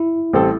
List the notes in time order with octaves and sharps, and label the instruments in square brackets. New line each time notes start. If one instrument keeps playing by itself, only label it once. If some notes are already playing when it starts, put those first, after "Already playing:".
Already playing: [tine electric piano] E4
[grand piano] A1 G3 C4 A4